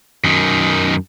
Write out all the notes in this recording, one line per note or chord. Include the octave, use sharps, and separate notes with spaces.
F#2 D#3